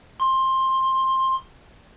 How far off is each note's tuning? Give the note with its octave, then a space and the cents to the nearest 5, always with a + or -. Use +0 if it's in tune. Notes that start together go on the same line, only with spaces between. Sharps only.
C6 +15